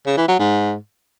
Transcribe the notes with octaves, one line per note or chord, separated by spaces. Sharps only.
C#3
E3
F#3
G#2